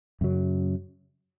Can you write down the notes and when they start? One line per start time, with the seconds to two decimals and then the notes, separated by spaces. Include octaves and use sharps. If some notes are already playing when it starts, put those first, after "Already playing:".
0.21 F#2 C#3 F#3